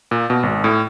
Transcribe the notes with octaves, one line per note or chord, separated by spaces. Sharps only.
A#2
B2
G#1
A2